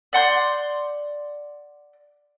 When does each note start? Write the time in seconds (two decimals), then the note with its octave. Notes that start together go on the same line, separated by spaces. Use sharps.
0.13 D5 F#5 C6 G6